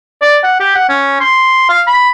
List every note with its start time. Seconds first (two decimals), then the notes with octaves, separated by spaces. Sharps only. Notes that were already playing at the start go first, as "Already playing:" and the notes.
0.21 D5
0.43 F#5
0.60 G4
0.75 F#5
0.89 C#4
1.20 C6
1.69 F5
1.87 B5